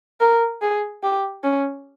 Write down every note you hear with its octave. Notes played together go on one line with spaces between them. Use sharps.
A#4
G#4
G4
C#4